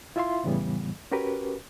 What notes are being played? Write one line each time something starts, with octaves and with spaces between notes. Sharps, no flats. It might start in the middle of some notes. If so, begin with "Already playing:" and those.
E4 F4 E5 F5 C6
F2 A2 C#3 E3 G3 B3
C#4 F#4 G4 A#4 B4